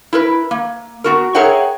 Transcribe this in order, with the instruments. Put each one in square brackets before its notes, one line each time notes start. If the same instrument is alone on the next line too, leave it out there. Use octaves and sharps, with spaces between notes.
[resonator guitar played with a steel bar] E4 A#4 B4
A#3
B3 F#4 A#4
G#4 A#4 C#5 E5 F#5 G5